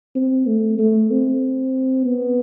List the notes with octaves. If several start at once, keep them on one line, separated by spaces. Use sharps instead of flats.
C4
A3
A3
C4
B3